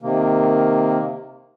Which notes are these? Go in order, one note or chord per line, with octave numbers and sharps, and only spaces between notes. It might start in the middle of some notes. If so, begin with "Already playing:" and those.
C3 D#3 A#3